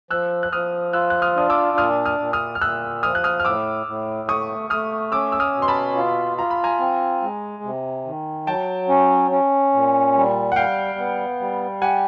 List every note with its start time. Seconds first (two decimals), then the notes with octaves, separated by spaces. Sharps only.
0.11 F3 E6 F#6
0.43 F#6
0.52 F3 D#6 F6
0.93 F4 E6 F#6
1.10 F#6
1.22 D#6 F6
1.36 D4 D#6
1.50 D6 E6
1.77 A#2 D#6 F6
2.05 D#6 F6
2.20 A#2
2.33 D#6 F6
2.55 F6
2.61 A#2 E6 F#6
3.03 F3 D#6 F6
3.15 F#6
3.24 D#6 F6
3.40 F6
3.45 A2 D6 E6
3.86 A2
4.28 A3 C#6 D#6
4.70 A3 D#6 F6
5.12 C#4 D6 E6
5.32 E6
5.40 D#6 F6
5.55 B2
5.62 C6
5.68 A5 B5
5.96 F4
6.38 F4 A#5
6.50 B5
6.64 G#5 A#5
6.79 C4
7.22 G#3
7.63 C3
8.05 D#3
8.47 F#3 G5 A5
8.89 C#4
9.31 C#4
9.73 A#2
10.15 G3
10.52 F#5
10.56 G3 F5 G5
10.98 B3
11.40 G3
11.82 G4 F#5 G#5